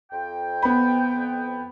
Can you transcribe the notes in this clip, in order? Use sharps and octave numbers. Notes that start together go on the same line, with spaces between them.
F2 G5
B3 B5